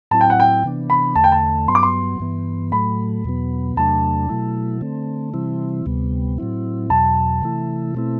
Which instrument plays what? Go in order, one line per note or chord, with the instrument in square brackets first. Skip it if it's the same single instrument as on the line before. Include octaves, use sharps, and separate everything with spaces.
[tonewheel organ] A2 F#3 C4 E4 [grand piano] A5
[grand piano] G5
F#5
G5
[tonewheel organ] C3 E3 B3 D4
[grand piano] B5
[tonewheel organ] E2 D3 A3 [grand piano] A5
[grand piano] G5
A5
[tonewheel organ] G2 F#3 B3 [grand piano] C6
[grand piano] D6
C6
[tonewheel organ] G2 E3 B3
[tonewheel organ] A2 F#3 A3 [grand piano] B5
[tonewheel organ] E2 B2 F#3 B3
[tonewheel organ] E2 C3 F#3 A3 D4 [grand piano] A5
[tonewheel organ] B2 F#3 A3 E4
D3 A3 C4
C3 E3 G3 C4 E4
D2 C3 G3 B3
A2 F#3 C4 E4
[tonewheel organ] E2 B2 F#3 [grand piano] A5
[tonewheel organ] C3 E3 A3 E4
B2 A3 C4 E4